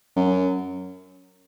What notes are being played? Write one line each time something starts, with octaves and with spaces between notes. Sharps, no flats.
F#2